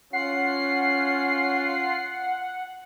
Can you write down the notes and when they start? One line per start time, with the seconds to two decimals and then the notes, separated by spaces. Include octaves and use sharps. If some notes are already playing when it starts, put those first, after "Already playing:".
0.13 C#4 F4 F#5 C7